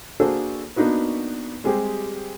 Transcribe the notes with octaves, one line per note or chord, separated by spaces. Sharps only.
A#3 D4 F#4 G#4 A4 C5
A#3 B3 D4 D#4 F#4 B4
G3 G#3 C4 G4 G#4